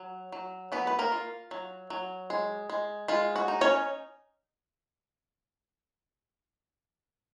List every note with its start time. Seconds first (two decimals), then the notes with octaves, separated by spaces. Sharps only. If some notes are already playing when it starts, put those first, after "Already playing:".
Already playing: F#3
0.32 F#3
0.72 F#3 B3 B4
0.87 B4
0.99 A#3 A#4
1.12 F4
1.51 F#3
1.90 F#3
2.30 G#3
2.70 G#3
3.08 G#3 F4
3.36 F#4
3.48 D#4
3.61 C#4 C#5